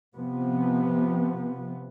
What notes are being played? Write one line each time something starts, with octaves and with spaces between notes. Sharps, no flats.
C3 F3 B3